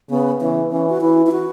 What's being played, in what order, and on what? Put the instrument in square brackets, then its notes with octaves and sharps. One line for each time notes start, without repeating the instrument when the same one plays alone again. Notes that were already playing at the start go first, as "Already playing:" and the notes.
[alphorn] C#3 [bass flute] B3
[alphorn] E3 [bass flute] C#4
[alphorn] E3 [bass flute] C#4
[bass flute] F#4
[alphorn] E3 [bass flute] E4
[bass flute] E4
F#4